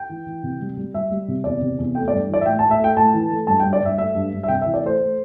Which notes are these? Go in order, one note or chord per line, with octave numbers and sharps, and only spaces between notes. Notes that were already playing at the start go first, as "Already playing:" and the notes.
Already playing: G5
E3
E3
C3
G3
G3
G3 E5
G3
C3
E2 D5
C3
E2
A3 G5
D5
G2
E3 D5
E5
A2 G5
A5
A2
E5
A3 G5
A2 A5
E3
A3
G2 A5
G5
G2
D5
G2 E5
A3 E5
G2
G2
E5
C3 G5
E5
E3
D5
A3 C5
A3